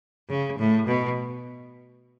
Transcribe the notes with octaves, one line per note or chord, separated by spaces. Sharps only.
C#3
A2
B2